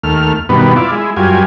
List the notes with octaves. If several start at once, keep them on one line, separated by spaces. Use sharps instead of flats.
D#2 A3 F6
G2 B2 D#3 B3
E4 F4 D5
G#3 E4
F#2 G3 F4 G#5